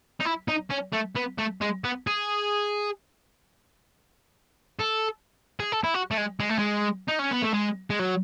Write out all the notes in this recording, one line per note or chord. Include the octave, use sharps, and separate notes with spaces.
D#4
E4
D#4
C#4
A3
B3
A3
G#3
B3
G#4
A4
G#4
A4
E4
F#4
A3
G#3
G#3
A3
G#3
D#4
C#4
B3
A3
G#3
G#3
F#3